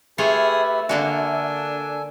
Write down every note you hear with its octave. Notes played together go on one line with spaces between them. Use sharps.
A3 F4 G4 G#4 B4 C#5 E5 B5
D3 A#3 D4 F#4 A4 G#5